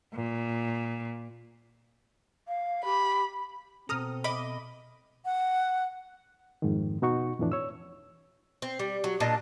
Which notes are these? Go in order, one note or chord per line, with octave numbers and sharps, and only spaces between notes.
A#2
F5
G4 B5
B2 C4 A4 A#5 D#6 F6
D#5 B5 D6
F#5
F2 G#2 D#3
B2 D#4 F#4 C#6
F2 A2 E3 D4
C#5 E6
C4
G3
F#3
A#2 D4 D#5 A5